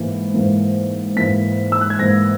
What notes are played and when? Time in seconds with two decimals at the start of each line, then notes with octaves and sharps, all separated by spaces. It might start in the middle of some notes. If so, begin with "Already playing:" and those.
Already playing: G#2 E3 A#3
0.34 G#2 E3 A#3
1.16 G#2 E3 A#3 B6
1.72 E6
1.81 F#6
1.90 G#6
1.99 G#2 E3 A#3 A#6